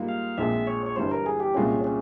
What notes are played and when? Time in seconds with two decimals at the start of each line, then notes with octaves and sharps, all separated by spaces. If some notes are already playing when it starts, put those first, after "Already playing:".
Already playing: G#2 G3 A#3 F4
0.08 F5
0.38 A#1 A#2 F3 G#3 C4 E5
0.67 C#5
0.86 C#5
0.96 G1 G2 E3 G3 C5
1.11 A#4
1.26 G#4
1.40 G4
1.54 C2 A#2 G#3 C4 C#4 F4
1.84 C#4